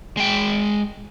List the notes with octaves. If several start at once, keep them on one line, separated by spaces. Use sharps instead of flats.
G#3 G5